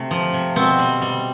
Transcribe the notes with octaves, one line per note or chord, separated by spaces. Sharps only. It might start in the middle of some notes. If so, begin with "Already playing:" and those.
Already playing: C3 A3
F3
C3
B2 C4
G3
G3